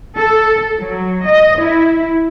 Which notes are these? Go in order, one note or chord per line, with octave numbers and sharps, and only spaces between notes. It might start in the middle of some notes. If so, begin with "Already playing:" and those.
A4
F#3
D#5
E4